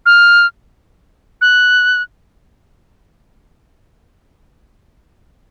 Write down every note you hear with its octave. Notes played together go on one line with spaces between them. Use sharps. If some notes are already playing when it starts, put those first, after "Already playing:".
F6
F#6